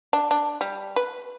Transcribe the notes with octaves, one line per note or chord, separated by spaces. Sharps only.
D4
D4
G3
B4